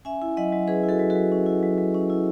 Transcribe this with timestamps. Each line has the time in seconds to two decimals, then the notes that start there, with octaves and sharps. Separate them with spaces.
0.05 C#4 E5 G#5
0.22 E4
0.37 F#3 D#5 F#5
0.52 F#3
0.68 C#4 G#4 B4
0.83 E4
0.89 F#4 A4
0.99 F#3
1.10 F#4 A4
1.16 F#3
1.32 C#4
1.46 E4
1.63 F#3
1.78 F#3
1.94 C#4
2.10 E4